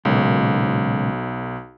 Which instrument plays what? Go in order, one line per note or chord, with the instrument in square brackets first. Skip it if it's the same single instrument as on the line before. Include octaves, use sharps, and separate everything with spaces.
[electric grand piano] B1 [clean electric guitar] A#2 C#3 G#3